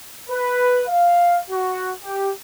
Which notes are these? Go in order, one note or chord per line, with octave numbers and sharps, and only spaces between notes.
B4
F5
F#4
G4